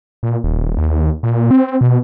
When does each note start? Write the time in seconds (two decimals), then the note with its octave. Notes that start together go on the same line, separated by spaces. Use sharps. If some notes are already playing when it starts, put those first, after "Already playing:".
0.23 A#2
0.44 D#1
0.78 D#2
1.23 A#2
1.51 C4
1.81 B2